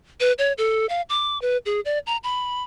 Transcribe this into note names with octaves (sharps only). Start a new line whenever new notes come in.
B4
C#5
A4
F5
D6
B4
G#4
D5
A#5
B5